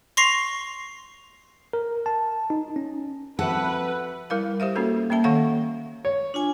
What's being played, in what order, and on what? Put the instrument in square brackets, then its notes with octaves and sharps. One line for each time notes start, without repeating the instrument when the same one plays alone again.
[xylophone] C6 C#6 A#6 C7 F7
[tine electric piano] A#4
A5
D#4
C#4
[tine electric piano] F3 C4 E5 [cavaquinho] F#4 A4 [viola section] B4 [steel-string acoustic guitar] F#5
[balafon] G3 E4 A#4 F5
G4 C5 E5 F5
A#3 C#4 F#4 A4
A#3 C#4 E5 A5
D#3 A4 C#5 F5 F#5
[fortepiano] C#5
[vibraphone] D4 F4 G#5